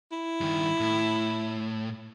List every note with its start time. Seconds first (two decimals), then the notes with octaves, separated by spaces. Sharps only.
0.12 E4
0.41 G2 D#3
0.80 A2